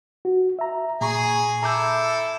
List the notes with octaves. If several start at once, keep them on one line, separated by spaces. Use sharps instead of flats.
F#4
E5 A#5
A#2 G#4 A#5 C#6
E4 A4 A#5 D6 G6